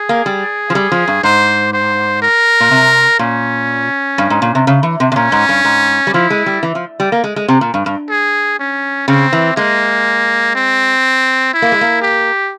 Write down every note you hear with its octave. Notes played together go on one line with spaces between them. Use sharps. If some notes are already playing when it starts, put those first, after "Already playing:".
Already playing: G#4
A#3
G3
F3
G3
F3
G2
G#2 C5
C5
A#4
A#2
C3
A#2 C#4
G2
G#2
A#2
C3
C#3
E3
C3
C3
A#2 C#4
G#2
G2
G#2
G3
F3 E4
G#3
G3
E3
F3
G3
A#3
G#3
G#3
C3
A#2
G2
G2
G#4
C#4
C#3 C4
E3
G#3 A#3
C4
E4
A#3
G#3
A#3
G4